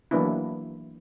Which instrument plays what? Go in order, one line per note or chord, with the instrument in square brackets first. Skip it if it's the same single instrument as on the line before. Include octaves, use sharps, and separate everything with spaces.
[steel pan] E3 F#3 A#3 B3 D4 E4